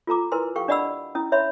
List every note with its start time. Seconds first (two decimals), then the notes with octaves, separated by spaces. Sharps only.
0.07 F4 A4 A#5 D6
0.32 E4 A#4 B4 G#5 C6
0.55 G4 A4 F5 G5 C#6
0.68 D4 D5 D#5 F#5 B5 E6
1.15 C#4 E4 D#6
1.32 C#5 E5 B5 C6